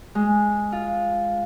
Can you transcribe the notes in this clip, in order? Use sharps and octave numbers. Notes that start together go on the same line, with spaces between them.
G#3
F4